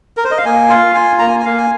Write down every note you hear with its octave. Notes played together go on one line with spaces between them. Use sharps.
A#4
C5
D#5
F5
A#3 G#5
F4 F5
F4 G#5
A#3 A#5
G#5
G#5
A#3 F5
G#5